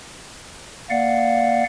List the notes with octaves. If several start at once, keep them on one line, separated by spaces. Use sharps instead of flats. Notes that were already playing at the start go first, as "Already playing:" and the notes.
A#3 D5 F5 F#5